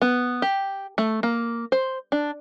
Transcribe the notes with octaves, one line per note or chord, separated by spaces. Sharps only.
B3
G4
A3
A#3
C5
D4